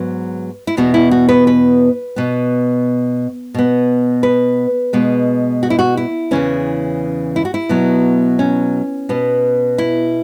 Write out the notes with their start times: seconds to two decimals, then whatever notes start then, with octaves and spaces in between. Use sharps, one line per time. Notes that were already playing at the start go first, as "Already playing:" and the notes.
Already playing: G#2 F#3 B3 B4
0.67 E4
0.77 E2 B2 B3 F#4
0.94 E4
1.11 F#4
1.29 B4
1.47 B4
2.16 B2 B3
3.54 B2 B3
4.23 B4
4.93 B2 G#3 B3
5.63 F#4
5.70 E4
5.79 F#4
5.97 E4
6.31 E2 C#3 E3 C#4
7.36 E4
7.45 F#4
7.54 E4
7.69 B2 F#3 B3
8.39 C#4
9.09 B2 B3
9.78 E4